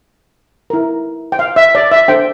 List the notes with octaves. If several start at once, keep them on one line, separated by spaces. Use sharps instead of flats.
E4 A#4
G5
F5
E5
D5
E5
D4 A4 C5 G5